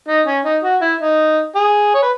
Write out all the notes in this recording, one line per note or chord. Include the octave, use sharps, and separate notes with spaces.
D#4
C#4
D#4
F#4
E4
D#4
G#4
C#5
B4